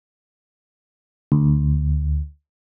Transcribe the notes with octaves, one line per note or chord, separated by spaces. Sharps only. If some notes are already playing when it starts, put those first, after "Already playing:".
D2